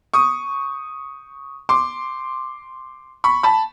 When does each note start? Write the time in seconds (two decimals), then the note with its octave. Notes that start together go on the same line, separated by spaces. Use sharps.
0.14 C#6 D#6
1.69 C6 D6
3.24 B5 C#6
3.43 A5 B5